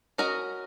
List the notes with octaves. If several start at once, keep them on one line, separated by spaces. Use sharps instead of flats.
C#4 F#4 A#4 D#5